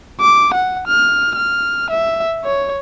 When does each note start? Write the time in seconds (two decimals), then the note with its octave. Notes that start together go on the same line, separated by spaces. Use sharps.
0.21 D6
0.54 F#5
0.87 F6
1.36 F6
1.90 E5
2.44 C#5